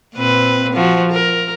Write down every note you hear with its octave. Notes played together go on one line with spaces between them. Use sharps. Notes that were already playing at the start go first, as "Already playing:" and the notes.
A#2 C4 B4
F3 F#4
A#4